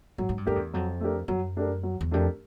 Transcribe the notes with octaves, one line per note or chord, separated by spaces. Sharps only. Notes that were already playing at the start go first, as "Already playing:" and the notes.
G#2 F#3
G#2
G2
F2 A3 D4 G4 A#4
E2
F2 F#3
A3 D4 G4 A#4
F#2 F#3
A3 D4 G4 A#4
F#3
E2
F2 A3 D4 G4 A#4